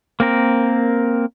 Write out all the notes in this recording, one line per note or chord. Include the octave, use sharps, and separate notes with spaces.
A#3 C4 A#4